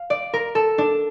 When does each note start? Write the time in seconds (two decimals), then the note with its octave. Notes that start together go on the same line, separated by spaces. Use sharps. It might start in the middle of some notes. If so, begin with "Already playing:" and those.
Already playing: F5
0.10 D5
0.33 A#4
0.55 A4
0.78 D4